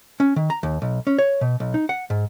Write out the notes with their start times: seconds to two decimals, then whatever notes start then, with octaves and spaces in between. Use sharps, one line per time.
0.20 C#4
0.36 D#3
0.50 A#5
0.63 D#2
0.82 B1
1.07 C#4
1.19 C#5
1.41 B2
1.60 B1
1.74 D#4
1.89 F#5
2.10 G#2